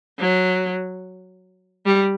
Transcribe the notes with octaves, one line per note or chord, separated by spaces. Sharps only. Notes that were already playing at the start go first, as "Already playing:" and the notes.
F#3
G3